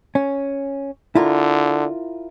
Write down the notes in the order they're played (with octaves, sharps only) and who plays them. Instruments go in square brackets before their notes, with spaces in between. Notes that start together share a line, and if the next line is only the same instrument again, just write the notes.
[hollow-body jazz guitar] C#4
[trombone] D3 [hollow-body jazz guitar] E4 F4 A#4